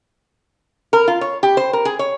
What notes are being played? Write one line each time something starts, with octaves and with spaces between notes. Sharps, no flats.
A#4
F4
C#5
G4
C5
A#4
G#4
C#5